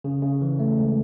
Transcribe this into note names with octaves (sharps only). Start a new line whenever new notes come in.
C#3
C#3
E3
A3
C#2